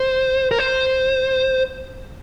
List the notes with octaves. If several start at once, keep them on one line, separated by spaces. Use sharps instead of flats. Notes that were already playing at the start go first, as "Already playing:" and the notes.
Already playing: C5
A#4
C5